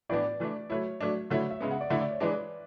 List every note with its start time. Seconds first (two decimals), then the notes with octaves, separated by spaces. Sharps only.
0.09 A2 E3 B3 D4 D5
0.40 E3 A3 D4
0.70 F#3 A3 E4 C#5
1.01 F#3 A3 D4
1.30 D3 F#3 A3 E4 C#5
1.51 E5
1.60 C#3 G#3 B3
1.71 F#5
1.81 D5
1.90 D3 A3 E4 E5
2.01 D5
2.11 C#5
2.20 E3 G#3 D4 B4